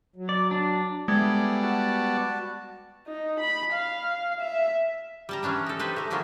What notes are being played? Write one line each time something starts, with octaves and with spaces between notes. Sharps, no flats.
F#3
D5
D4
G3 G#3 B3 E4 G#4 A4 D5
F#4 A5
D#4
B5
F5
E5
G3 A5 A#5
E3 C#4 D4 G5
D#4 A4
G4 B4 C5 G#5
A3 D#4
D#3 E3 F#3 G3 A#3 F4